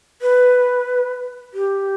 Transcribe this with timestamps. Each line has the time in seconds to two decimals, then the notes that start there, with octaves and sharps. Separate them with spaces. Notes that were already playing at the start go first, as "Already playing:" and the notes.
0.22 B4
1.54 G4